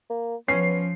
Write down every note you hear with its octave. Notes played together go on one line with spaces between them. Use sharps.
A#3
F3 B3 C#4 C7